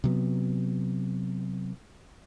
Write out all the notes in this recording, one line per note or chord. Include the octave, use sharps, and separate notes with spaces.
C3 F#3 B3